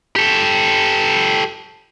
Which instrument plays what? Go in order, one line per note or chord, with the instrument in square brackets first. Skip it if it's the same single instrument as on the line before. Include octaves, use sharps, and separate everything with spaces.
[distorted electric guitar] G4 A4